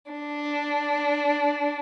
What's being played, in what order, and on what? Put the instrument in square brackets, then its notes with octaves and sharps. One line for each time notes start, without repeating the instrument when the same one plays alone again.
[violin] D4